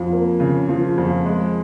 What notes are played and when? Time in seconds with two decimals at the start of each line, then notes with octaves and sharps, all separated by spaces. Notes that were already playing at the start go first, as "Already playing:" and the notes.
Already playing: F2 F3
0.12 A#3
0.40 C#3
0.68 F3
0.98 F2
1.26 G#3